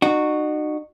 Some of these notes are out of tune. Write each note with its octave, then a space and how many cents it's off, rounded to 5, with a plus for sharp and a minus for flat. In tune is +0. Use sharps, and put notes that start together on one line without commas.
D#4 -40 F#4 +0